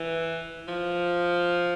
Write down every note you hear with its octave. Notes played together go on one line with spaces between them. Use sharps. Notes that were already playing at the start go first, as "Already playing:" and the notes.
Already playing: E3
F3